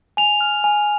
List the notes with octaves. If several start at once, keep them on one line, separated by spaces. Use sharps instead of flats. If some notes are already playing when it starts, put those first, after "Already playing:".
G#5 F7
F6
G#5